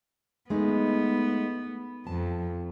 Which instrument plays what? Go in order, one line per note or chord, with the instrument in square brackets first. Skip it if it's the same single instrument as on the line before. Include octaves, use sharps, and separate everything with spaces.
[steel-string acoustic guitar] G#3 A3 D#4 [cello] B3
[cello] F2 [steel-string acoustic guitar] A5